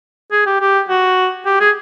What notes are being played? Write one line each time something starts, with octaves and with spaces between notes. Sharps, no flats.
G#4
G4
G4
F#4
G4
G#4